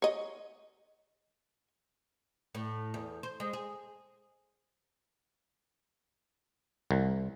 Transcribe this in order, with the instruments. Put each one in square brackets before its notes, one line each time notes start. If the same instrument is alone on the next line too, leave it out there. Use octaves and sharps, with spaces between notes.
[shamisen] C#5 D#5
[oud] A2
E2
C5
G#3
G#4
[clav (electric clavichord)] C2